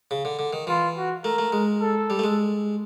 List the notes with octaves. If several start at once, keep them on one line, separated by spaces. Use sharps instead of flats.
C#3
D3
D3
D#3
E3 F4
F#4
A3 A#4
A3
G#3
A4
G3
A3
G#3